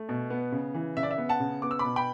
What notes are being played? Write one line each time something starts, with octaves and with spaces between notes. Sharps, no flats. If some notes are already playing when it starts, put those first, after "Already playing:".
Already playing: A3
B2
B3
C#3
E3
C#3 E5
D5
E5
B3
F#5 A5
C#3
B3 D6
E6
B5 D6
B2
G5 B5